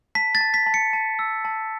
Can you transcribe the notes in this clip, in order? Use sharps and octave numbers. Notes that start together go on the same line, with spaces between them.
A5 B6
A6
A5
B6
A5
C#7
A5
E6
A5